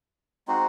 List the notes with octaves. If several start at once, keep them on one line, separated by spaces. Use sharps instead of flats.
G#3 C4 D#4 F#4